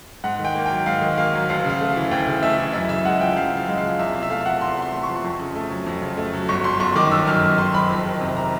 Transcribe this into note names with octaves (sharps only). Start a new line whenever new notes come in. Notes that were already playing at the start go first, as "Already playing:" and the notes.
G#2 F#5
D#3
G5
A#3
F#3 G5
G#2 F5
D#3
A#3 F5
F#3
D2 F5
C#3
F5
A3
E3
D2 G5
C#3
A3 E5
E3
F#2 E5
C#3 E5
G#3 F#5
F3 G5
F#2 F5
C#3
F5
G#3
F5
F3
E2 E5
C3 F5
E5
A3 F5
F3 F#5
E2 C6
C3
C6
A3
C#6
F3
F2
C#3
A3
F#3
F2
C#3
A3
F#3
G1 C#6
F#2 C6
G1 C#6
D#3 D6
G1 E6
F#2 F6
G1
D#3 C6
F#1 B5
F2
D#3
C3
A#5